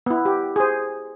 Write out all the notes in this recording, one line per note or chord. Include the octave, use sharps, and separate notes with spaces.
B3 E4
G4
G#4 C5